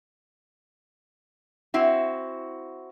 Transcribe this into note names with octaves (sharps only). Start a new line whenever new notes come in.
C4 E4 F#4